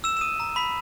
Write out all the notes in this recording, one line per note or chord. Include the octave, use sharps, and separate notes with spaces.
E6 E7
E7
D#6 D#7
A#5
B5 B6